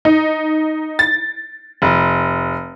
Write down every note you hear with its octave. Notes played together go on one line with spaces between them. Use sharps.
D#4
A6
F1